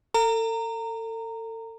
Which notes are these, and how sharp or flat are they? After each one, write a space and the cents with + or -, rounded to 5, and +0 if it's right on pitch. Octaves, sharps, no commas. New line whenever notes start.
A4 +35 A#5 -15